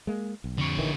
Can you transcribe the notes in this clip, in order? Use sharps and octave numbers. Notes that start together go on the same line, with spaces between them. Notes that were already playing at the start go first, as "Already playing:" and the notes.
G#3 A#3
B1
F2 D3 C#5
A#1 D#3 E3